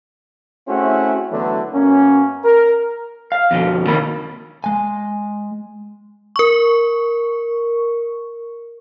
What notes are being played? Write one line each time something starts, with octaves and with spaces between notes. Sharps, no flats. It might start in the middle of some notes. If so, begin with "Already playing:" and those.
A3 C4 C#4 E4 F#4 G#4
D3 E3 F#3 A3 B3 D4
F#2 A#3 B3 C#4
A#4
F5
F2 B2 D3
D#3 A#3 B5
G#3 G#5
A#4 C#6